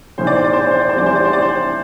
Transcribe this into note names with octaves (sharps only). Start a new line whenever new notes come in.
B1 A2 E3 C5
D5
C5
D5
C5
D5
C5
D5
C5
C2 C3 E3 D5
C5
D5
C5
D5
C5